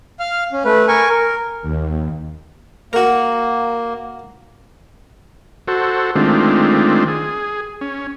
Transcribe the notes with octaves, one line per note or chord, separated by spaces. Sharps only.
F5 F6
C#4
A3 B4
A#4 G#5 C#6
A#4
D#2
A#3 F#4 A#4
F#4 A4 C5
D#3 G#3 A3 C4 D4 F4
G#4
C#4